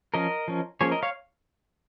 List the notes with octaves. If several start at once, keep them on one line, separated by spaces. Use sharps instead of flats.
F3 C#4 A#4 D#5
F3 C#4
F3 A#3 C#4 G#4 C#5
A#4 D#5
C#5 F5